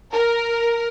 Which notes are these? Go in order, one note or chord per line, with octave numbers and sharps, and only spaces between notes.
A#4